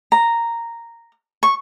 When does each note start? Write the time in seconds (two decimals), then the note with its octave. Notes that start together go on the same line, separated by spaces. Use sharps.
0.12 A#5
1.43 C#6